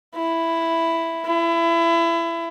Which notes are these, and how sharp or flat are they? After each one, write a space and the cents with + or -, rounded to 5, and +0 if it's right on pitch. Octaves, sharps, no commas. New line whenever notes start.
E4 +5
E4 +25